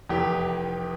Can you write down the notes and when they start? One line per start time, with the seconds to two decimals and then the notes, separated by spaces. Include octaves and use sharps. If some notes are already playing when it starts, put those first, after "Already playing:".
0.09 F1 E2 E3 G4